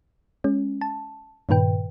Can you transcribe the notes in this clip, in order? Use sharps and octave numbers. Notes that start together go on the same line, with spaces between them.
G#3 C#4
A5
G2 A#2 D#3 B4 G5